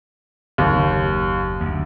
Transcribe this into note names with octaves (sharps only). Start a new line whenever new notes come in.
F#1 D#2
D2